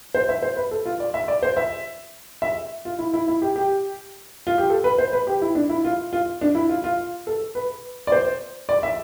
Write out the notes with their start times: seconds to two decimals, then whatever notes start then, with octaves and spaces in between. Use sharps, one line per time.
0.14 C5
0.29 E5
0.42 C5
0.57 B4
0.71 A4
0.86 F4
1.00 D5
1.14 E5
1.28 D5
1.43 C5
1.57 E5
2.42 E5
2.85 F4
2.99 E4
3.14 E4
3.28 E4
3.42 G4
3.56 G4
4.47 F4
4.58 G4
4.70 A4
4.84 B4
4.98 C5
5.13 B4
5.27 G4
5.42 E4
5.55 D4
5.69 E4
5.84 F4
6.13 F4
6.41 D4
6.55 E4
6.69 F4
6.84 F4
7.27 A4
7.55 B4
8.07 D5
8.12 C5
8.69 D5
8.83 E5